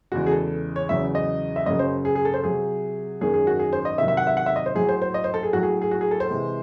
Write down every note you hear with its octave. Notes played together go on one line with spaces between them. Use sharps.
E2 C#3 G#3 F#4
G#4
A4
C#5
E2 C#3 F#3 E5
D#5
E5
F#2 C#3 F#3 D#5
C5
G#4
G#4
A4
C5
C3 F#3 G#4
F#2 D#3 G#3 G#4
G#4
F#4
G#4
C5
D#5
C3 D#3 F#3 E5
E5
F#5
E5
F#5
E5
D#5
C5
A2 F#3 G#4
C5
C5
D#5
C5
A4
G#4
A2 F#3 F#4
G#4
G#4
F#4
G#4
A4
C5
C3 E3 G#3